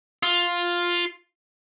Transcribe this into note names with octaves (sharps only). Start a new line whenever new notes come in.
F4